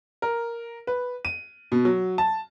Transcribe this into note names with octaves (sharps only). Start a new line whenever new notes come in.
A#4
B4
D#7
B2
F#3
A5